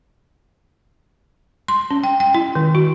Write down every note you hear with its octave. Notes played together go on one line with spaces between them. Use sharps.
C6
C#4
G5
G5
E4
D#3
F#4